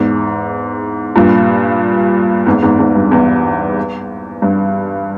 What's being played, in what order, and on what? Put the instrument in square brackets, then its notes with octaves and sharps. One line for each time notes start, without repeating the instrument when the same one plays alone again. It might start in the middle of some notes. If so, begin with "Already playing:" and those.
Already playing: [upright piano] E2 G#2
G2 A#2
E2 G#2
E2 G#2
E2 G#2
G2
E2
G2